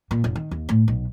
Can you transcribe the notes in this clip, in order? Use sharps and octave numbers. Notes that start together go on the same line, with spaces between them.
A#2
F1
D#3
D#2
A2
B1